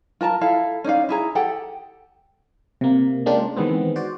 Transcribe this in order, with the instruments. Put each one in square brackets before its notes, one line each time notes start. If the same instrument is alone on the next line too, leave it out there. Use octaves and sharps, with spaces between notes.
[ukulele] F4 A#4 A5 A#5
E4 A4 F5
C#4 D#4 D5 F5
E4 G#4 A#5
G4 A4 F#5 G5
[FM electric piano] C3 A#3
G#3 A#3 C#4 D4 F4 G4
D#3 E3 G#3 B3 C4
F#4 C5 D5